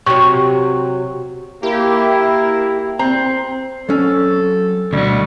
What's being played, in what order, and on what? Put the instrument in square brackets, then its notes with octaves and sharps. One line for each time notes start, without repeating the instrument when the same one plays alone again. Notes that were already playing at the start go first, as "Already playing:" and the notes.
[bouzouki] C3 F#3 [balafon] C#6
[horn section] A#3 E4 [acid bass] G4
[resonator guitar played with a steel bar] C4 [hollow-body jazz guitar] A#5
[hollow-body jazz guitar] F#3 C#4 [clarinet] A4
[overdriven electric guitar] D2 F#4 [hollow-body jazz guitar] B2 [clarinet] G3